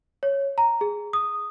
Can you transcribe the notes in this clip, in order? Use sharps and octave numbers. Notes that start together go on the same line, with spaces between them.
C#5
A#5
G#4
D#6